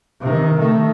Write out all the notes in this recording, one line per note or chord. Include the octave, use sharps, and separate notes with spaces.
C3 D#3
D#3 A3